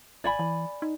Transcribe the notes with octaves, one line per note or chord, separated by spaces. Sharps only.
G#1 D5 G#5 B5
E3
D#4